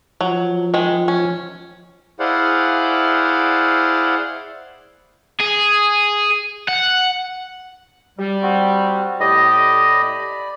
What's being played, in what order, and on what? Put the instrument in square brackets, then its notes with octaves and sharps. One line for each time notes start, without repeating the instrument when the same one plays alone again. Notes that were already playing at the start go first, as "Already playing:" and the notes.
[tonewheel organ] F3 [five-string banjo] F#3
[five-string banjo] D#3 G#3
C#4
[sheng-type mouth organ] E4 G#4 C5 D5 F5 F#5
[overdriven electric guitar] G#4
F#5
[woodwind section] G3
[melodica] C4 F#4
[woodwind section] A2 G4 [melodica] D5 B5 [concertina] D#5